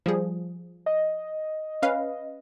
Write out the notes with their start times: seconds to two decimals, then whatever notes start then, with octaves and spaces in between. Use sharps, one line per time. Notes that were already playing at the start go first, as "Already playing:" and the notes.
0.06 F3 G3 G#4
0.86 D#5
1.83 C#4 B4 F5